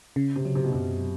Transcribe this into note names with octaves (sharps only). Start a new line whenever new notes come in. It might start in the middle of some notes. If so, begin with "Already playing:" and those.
C#3
C3
F#3
C3
B2
F#2 C3